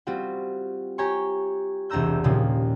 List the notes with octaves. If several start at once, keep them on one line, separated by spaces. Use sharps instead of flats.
G3 C4 F4 F#4
G4 C#5 G5 G#5 A#5 C#6
E1 C2 D4 A#5 E6 G6
D#2 A#2 C#3 F3